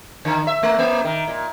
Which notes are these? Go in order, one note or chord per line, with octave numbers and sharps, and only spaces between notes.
D3
E5
A3
A#3
D#3
A#2